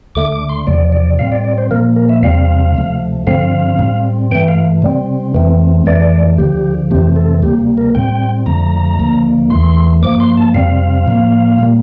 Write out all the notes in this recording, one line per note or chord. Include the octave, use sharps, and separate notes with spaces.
D2 D3 A3 D6
D6
C6
E2 C3 F3 D5
D5
A2 G3 C4 F5
D5
D5
C5
A#2 F3 A#3 A#4
A#4
E5
E2 C3 G3 C4 F5
D2 C3 F3 A3
G2 D3 F3 C4 F5
A2 G3 C4
G2 E3 A3 G5
F5
C3 G3 C4
F2 E3 A3 C4
F2 E3 A3 D5
D2 D3 F3 G4
F2 C3 E3 A3 C4 G4
A4
D2 C3 G3 A#3 G4
A#4
A2 G3 C4 G5
F2 D3 F3 A3 A#5
D2 D3 F3 A#3
E2 E3 A3 C6
G2 F3 A#3 D6
C6
A5
F2 C3 G3 C4 F5
A2 F3 A#3
A#2 G3 A#3